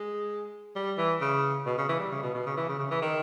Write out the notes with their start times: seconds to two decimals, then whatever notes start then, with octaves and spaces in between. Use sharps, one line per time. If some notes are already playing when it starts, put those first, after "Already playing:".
Already playing: G#3
0.76 G3
0.98 E3
1.21 C#3
1.66 B2
1.78 C#3
1.89 E3
2.00 G3
2.12 C#3
2.22 B2
2.34 B2
2.46 C#3
2.57 E3
2.68 C#3
2.79 C#3
2.91 E3
3.02 D#3